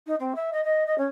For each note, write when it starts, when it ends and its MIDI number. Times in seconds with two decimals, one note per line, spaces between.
0.07 0.15 63
0.20 0.33 60
0.35 0.50 76
0.52 0.64 75
0.64 0.86 75
0.86 0.98 75
0.98 1.06 61